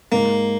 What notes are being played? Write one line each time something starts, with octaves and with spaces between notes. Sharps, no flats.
G#2 A#3